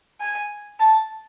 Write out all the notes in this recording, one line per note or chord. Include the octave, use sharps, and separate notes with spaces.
G#5
A5